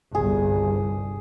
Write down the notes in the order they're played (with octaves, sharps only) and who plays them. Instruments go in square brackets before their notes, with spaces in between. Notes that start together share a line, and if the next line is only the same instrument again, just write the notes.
[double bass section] G1 C2 [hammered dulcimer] G#4